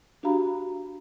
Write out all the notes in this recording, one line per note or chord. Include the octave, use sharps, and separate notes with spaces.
D4 F#4 G4 F5 A#5 B5